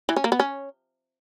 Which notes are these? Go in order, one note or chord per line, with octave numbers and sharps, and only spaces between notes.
E3
C#4
A#3
B3
C#4